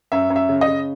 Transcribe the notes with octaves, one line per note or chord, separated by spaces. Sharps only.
F#2 E5
F#2
E5
C#3
D#5
C#3